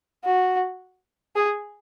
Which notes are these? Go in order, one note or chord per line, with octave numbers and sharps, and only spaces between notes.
F#4
G#4